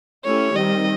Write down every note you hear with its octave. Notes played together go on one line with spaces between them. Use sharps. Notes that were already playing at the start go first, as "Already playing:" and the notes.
A3 C#4 E4 G4 C#5
D#3 G3 C4 D#5